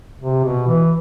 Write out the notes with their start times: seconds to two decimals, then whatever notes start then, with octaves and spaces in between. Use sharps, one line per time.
0.20 C3
0.44 B2
0.67 E3